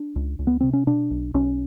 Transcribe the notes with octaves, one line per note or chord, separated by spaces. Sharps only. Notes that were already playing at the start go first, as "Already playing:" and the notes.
Already playing: D4
C#2
C#2
B3
C3 C4
C#4
B2 D4
B1
B1 C#4